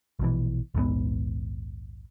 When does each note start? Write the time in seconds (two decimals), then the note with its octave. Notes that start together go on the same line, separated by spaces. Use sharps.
0.19 A#1 B2 E3
0.74 A#1 D#2 G#2 B3